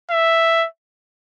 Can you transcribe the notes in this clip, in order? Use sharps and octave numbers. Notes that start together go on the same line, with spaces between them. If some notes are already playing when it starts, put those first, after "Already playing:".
E5